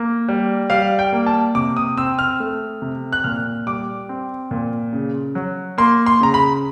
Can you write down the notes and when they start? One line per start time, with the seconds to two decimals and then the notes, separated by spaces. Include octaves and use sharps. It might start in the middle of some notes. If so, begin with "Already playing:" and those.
Already playing: A#3
0.28 G3
0.70 G3 F5
0.99 G5
1.12 A#3
1.26 A5
1.55 C3 D6
1.77 D#6
1.97 C4 E6
2.19 F6
2.40 A3
2.82 C3
3.13 F#6
3.24 A#2 F6
3.67 G3 D6
4.09 C4
4.51 A#2
4.93 C#3
5.35 F#3
5.78 A#3 C6
6.06 C6
6.21 C#3 A#5
6.34 B5